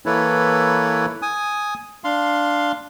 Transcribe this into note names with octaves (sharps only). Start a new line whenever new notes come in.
E3 A#3 E4 A4 B4 C#5
G#5 D#6
D4 F5 C6